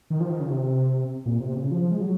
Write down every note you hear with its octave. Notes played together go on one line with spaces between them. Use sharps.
D#3
F3
D#3
C#3
C3
A#2
C3
C#3
F3
F3
G#3
F#3